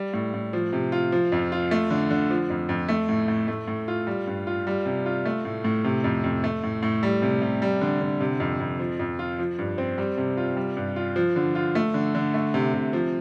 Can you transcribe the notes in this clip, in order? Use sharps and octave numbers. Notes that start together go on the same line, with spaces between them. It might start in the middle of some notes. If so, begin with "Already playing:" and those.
Already playing: G3
A2
A2
F3
C3
F4
F3
F2
F4
A3
D3
D3
F3
F2
F2
A3
A2
A2
A3
A2
F4
G3
G2
F4
G3
C3
F4
A3
A2
A2
C3
F2
F2
A3
A2
A2
G3
C3
C3
G3
D3
D3
C3
F2
F2
F3
F2
F4
F3
G2
C4
G3
C3
F4
G3
G2
F4
F3
D3
F4
A3
D3
D3
A3
C3
C3
F3